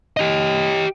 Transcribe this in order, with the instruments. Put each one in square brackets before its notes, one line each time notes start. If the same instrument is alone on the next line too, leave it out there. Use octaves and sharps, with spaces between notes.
[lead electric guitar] G4 D#5